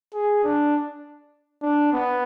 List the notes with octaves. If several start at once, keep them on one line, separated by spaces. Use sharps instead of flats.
G#4
D4
D4
B3